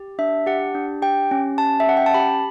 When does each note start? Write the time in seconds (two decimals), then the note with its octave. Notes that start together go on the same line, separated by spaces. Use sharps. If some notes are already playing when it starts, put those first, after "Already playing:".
Already playing: G4
0.19 D4 E5
0.46 G4 F#5
0.75 D4
1.02 G4 G5
1.31 C#4
1.58 G4 A5
1.80 E5
1.87 C#4 F#5
1.97 G5
2.06 A5
2.14 G4 B5